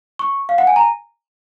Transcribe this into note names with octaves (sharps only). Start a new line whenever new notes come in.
C#6
F5
F#5
G#5
A#5